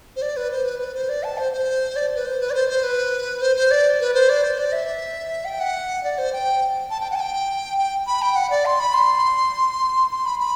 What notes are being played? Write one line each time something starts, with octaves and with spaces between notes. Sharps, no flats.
C5
D5
B4
C5
B4
B4
C5
D5
A5
C5
C5
D5
B4
C5
B4
D5
C5
C5
B4
C5
C5
D5
B4
C5
D5
C5
D5
E5
G5
F#5
D5
C5
G5
A5
G5
F#5
A5
G5
G5
B5
G5
F#5
D5
C6
B5
C6
C6
B5
B5